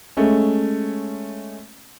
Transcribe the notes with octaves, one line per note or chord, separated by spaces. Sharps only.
G#3 A3 C#4